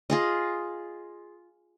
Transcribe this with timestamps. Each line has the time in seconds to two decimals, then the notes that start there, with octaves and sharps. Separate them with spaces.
0.10 F4 G#4 D#5